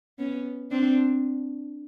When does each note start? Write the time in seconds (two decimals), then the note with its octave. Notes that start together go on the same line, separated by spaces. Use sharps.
0.18 B3 C#4
0.71 C4 D4